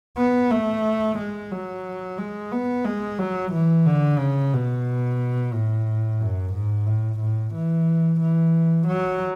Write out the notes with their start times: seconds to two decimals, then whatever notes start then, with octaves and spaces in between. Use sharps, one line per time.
0.17 B3
0.51 A3
1.18 G#3
1.51 F#3
2.18 G#3
2.52 B3
2.85 G#3
3.19 F#3
3.52 E3
3.86 D3
4.18 C#3
4.53 B2
5.53 A2
6.20 F#2
6.53 G#2
6.86 A2
7.20 A2
7.54 E3
8.20 E3
8.87 F#3